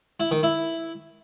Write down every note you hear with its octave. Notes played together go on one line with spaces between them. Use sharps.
E4
D#3
E4